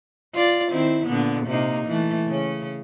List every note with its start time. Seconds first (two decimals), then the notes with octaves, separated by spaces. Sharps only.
0.34 F4 D5
0.72 D#3 C4 E4
1.06 A#2 D3 B3
1.46 C3 A#3 D#4
1.88 E3 A3
2.27 C#3 C#4